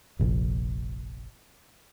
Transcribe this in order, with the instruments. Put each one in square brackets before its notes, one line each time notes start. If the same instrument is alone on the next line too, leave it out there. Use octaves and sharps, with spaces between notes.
[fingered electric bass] F1 A#1